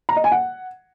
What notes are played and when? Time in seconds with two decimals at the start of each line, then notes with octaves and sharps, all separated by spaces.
0.09 A#5
0.16 D#5
0.24 G#5
0.32 F#5